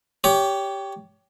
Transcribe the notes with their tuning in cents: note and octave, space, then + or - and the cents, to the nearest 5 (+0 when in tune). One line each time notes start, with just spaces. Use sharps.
G4 +0 C#5 +25